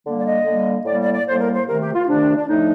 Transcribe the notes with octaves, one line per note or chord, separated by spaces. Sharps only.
D3 G3 A#3
D5
D#5
D3 G3 A#3
A2 G3 A#3 D5
D5
D5
A2 G3 A#3 C5
A#4
C5
C3 D#3 A3 A#4
G4
F4
C3 D#3 A3 D4
D4
A2 F3 A3 D4 D#4